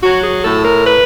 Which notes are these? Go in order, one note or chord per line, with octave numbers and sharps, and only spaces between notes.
F#3 F#4
G#4
A2 A4
A#4
B4